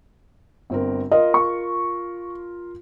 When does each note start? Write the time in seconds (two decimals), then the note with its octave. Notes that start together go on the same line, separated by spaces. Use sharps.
0.70 G1 C4 A#4
1.12 F4 A#4 D#5
1.34 C#6